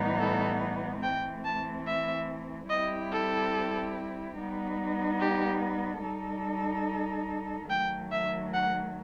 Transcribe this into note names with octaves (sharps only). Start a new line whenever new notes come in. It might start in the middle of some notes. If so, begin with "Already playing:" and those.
Already playing: A2 E3 G3 B3 D#4
A4
E3 A3 C4 G5
A5
E5
G3 C4 E4 G4 D#5
A4
G3 B3 D#4
G4
G3 D#4 A4
D#3 F#3 A3 G5
E5
F#5